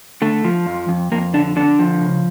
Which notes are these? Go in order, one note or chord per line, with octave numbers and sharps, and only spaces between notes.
D3 A3
F3
F2
F2
F2 A#3
D3 D4
D3 D4
F3
C#3